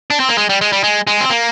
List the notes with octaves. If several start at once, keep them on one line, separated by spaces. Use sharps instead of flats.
D4
C4
A#3
G#3
G3
G#3
G3
G#3
G#3
C4
A#3